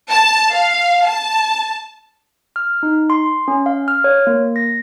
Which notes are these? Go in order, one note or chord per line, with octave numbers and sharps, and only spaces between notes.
A5
F5
A5
F6
D#4
C6
C#4
F5
F6
C#5
A#3
A#6